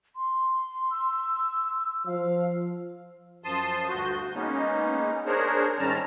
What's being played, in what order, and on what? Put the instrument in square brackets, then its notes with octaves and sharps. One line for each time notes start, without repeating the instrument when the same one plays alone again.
[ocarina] C6
[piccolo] E6
[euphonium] F3 [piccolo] F5
[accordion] F#2 F3 A5 C6 D#6
D2 G2 F#4 G6
G#3 A#3 B3 C#4 D#4
D4 G#4 A#4 C5 C#5
G#2 D#3 G3 C#4 A5 A#5